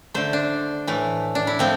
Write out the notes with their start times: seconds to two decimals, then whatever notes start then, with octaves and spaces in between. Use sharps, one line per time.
0.14 D3 A3 C5
0.33 D4
0.87 A2 E3 A3
1.35 D4
1.47 E4
1.59 F3 A3 C4